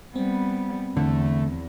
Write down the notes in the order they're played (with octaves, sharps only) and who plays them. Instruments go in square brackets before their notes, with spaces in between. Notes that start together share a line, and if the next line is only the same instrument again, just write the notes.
[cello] G3 B3 [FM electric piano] C4
[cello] E2 [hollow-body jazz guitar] D3 [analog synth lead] A3